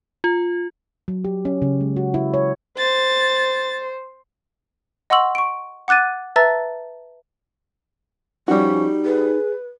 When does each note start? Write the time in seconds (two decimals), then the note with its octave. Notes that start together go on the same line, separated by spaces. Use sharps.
0.24 F4
1.08 F#3
1.24 G4
1.45 C#4
1.62 C#3
1.81 G#3
1.96 F#4
2.14 E4
2.34 C#5
2.78 C5 A6
5.10 D#5 F#5 C6 C#6 E6 F#7
5.35 C#6 D7
5.88 F#5 D6 F#6 A6 D#7
6.36 B4 E5 A5 A#5 E6 A6
8.48 F3 G3 C#4 D#4 F#4
9.05 G#4 B4